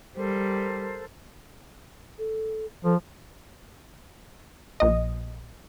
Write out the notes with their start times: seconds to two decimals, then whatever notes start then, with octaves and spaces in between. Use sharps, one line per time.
0.17 G3 A4 A#4 C5
2.18 A4
2.84 F3 A4
4.80 A#1 D#5